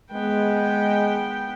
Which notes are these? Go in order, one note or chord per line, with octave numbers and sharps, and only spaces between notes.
G#3 B3 G5